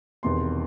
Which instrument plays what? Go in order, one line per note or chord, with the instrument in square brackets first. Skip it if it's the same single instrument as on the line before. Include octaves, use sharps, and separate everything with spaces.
[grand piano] E1 E2 C3 D#3 C6